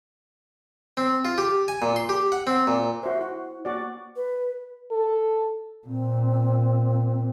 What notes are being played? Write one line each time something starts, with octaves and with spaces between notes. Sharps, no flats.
C4
F4
G4
G#5
A#2
C6
G4
F#5
C4
A#2
F#4 C5 E5
E4 F#4
A#3 F#4 D5
B4
A4
A#2 C4